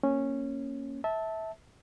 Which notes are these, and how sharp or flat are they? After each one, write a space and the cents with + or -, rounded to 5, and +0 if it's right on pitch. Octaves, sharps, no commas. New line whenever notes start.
A#3 +0 C#4 -10
E5 -20 A5 +0